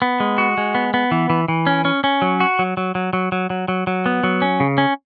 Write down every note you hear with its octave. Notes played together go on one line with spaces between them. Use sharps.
B3
G#3
F#4
G#3
B3
B3
E3
E3
E3
C#4
C#4
C#4
F#3
F#4
F#3
F#3
F#3
F#3
F#3
F#3
F#3
F#3
B3
F#3
C#4
C#3
C#4